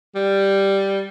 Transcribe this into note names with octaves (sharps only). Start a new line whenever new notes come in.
G3